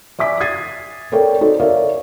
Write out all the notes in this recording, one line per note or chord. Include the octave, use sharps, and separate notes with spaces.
D5 E5 G#5 D6 B6
D#6 G#6 A6 C7 D#7
A4 A#4 C#5 D5 G5
D#4 F#4 A4 C5 D5
A#4 C#5 D5 E5 F5